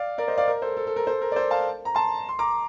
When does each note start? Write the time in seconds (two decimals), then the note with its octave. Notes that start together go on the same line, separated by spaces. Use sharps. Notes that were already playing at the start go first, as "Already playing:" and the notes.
Already playing: D5 F5
0.18 A#4 D5
0.28 C5 D#5
0.37 D5 F5
0.48 A#4
0.62 A4 C5
0.77 A4
0.87 A4
0.96 A#4
1.07 A4 C5
1.21 A#4
1.32 D5
1.36 A4 C5
1.51 F5 A5
1.85 A#5
1.95 A5 C6
2.29 C6
2.39 A#5 D6